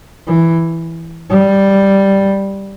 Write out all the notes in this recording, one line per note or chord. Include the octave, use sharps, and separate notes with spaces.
E3
G3